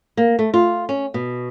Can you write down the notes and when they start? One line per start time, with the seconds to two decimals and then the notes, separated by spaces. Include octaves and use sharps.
0.17 A#3
0.39 A3
0.54 F4
0.89 C#4
1.14 B2